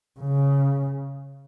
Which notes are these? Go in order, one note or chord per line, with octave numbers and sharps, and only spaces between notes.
C#3